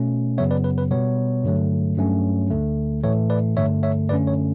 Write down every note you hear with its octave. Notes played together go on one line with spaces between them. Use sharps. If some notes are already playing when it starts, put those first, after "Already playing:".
Already playing: B2 A3 C#4
F#2 C#3 F#3 B3 C#5 E5
B4 D5
B4
B4
B2 G3 B3 C#5
G2 D3 F#3 A3
G2 F#3 A3 C#4
D2 D3 A3
A2 E3 A3 C#5
B4 D5
G2 D3 A3 C#5 E5
C#5 E5
F#2 D3 A3 C#4 B4 D5
C#5